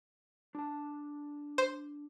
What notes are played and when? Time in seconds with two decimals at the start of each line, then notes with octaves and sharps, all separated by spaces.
0.55 D4 A5
1.58 C5